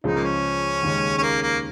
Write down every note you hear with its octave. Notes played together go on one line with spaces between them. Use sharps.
C#2 C#3 F3 G#3 D#4
A#3
C#4
D#2 C#3 G#3
C#4
A#3
A#3